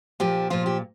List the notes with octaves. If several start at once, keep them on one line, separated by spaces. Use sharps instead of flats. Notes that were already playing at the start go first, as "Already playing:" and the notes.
A#2 F3 G4
A#2 F3 F4
G4